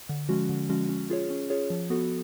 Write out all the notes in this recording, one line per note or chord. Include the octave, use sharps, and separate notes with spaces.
D3
F3 G#3 C#4 F#4
D3
F3 G#3 C#4 F#4
C#4
F4 G#4 C#5
C#4
F4 G#4 C#5
F3
B3 F#4 A4